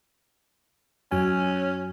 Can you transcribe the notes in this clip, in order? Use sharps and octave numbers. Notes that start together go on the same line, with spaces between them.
F#2 F#3 C#4 G#5